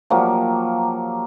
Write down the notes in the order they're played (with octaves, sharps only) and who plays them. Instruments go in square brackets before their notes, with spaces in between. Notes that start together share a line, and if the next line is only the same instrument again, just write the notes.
[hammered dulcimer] F3 F#3 A#3 G4